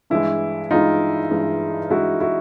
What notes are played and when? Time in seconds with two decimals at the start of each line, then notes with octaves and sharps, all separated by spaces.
0.10 G2 E3 G#3 E4
0.71 G2 E3 G#3 D#4 F4
1.31 G2 E3 G#3
1.90 G2 E3 G#3 E4 F#4
2.20 E4 F#4